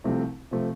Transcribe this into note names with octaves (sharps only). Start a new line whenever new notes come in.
C2 C3 F3 A3 C4
C3 F3 A3 C4